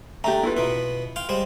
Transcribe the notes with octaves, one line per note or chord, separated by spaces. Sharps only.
A3 D4 G4 A#5
E4 F4 B4
B2 B3
F5 G5 C6
G3 G#3 C5